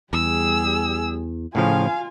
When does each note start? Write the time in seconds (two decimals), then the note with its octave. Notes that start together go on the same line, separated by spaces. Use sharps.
0.13 E2 G3 G#4 E6
1.55 A2 C#3 F3 F4 F5 G#5